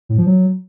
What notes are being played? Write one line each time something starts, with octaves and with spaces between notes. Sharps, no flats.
A2
F3
F#3